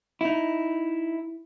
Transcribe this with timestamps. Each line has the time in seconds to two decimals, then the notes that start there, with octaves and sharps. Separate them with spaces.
0.21 D#4 E4